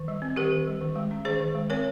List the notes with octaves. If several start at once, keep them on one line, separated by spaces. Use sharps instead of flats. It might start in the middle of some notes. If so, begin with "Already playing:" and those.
Already playing: D#3
G3
C4
D#3 G4 A#4
D#3
G3
D#3
G#3
C#4
D#3 G#4 C5
D#3
G#3
C4 A#4 C#5